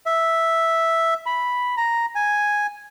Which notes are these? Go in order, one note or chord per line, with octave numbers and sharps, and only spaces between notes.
E5
B5
A#5
G#5